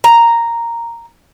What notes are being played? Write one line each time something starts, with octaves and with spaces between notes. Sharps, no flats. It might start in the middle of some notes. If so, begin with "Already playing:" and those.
A#5